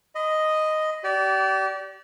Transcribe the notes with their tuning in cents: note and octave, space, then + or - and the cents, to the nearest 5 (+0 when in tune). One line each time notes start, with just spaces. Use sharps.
D#5 +0 B5 +35
G4 -35 D5 -20